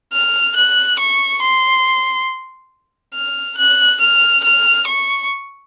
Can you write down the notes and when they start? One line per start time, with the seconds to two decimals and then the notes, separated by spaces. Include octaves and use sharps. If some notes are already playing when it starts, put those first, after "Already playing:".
0.13 F6
0.56 F#6
0.99 C#6
1.42 C6
3.14 F6
3.58 F#6
4.01 F6
4.44 F6
4.87 C#6